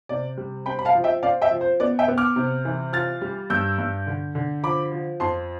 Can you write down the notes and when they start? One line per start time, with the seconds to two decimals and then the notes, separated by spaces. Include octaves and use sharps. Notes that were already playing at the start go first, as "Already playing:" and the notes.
0.09 C3 D5
0.38 G3
0.66 C4 G5 B5
0.79 B5
0.85 F5 A5
0.95 F3
1.04 E5 G5
1.23 C4 D5 F5
1.42 E5 G5
1.51 F3
1.61 C5
1.80 B3 D5
1.99 E5 G5
2.08 B3
2.18 D6 F6
2.36 C3
2.65 E3
2.93 F4 F6 A6
3.22 G3
3.50 G2 E6 G6
3.78 G2
4.07 D3
4.35 D3
4.64 F3 B5 D6
4.92 F3
5.20 F2 A5 C6